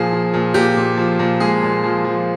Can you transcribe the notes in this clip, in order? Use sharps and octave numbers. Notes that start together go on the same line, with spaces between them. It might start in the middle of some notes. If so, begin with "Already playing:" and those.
Already playing: A#2 F3 G#4
F3
A#2
A#2 G4
A#2
F3
A#2
G#3 G#4
A#2
F3
F3